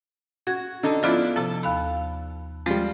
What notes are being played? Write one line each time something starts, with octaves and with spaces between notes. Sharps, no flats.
F#4 G#6
D3 D#4 A4
F3 B3 D4 E4 F4 F#6
C3 F3 A4 A5
D#2 F5 B5
F3 G3 G#3